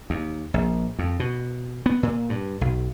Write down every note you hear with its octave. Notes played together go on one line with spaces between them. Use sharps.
D#2
A#1
F2
B2
B3
A#2
G2
B1